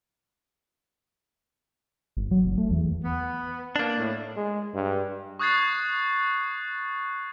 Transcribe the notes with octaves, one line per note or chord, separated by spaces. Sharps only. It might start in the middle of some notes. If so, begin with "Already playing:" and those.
G1
F#3
F#1
A3
E2
B3
A#3 D4
A2
G#3
G2
C#6 D#6 F#6 G#6 A6 C7